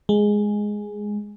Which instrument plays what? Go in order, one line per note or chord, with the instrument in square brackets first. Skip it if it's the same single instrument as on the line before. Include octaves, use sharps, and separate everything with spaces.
[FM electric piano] G#3